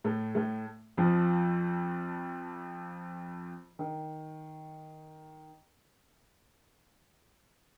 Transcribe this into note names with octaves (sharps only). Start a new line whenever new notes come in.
A2 A3
A2 A3
F2 F3
D#3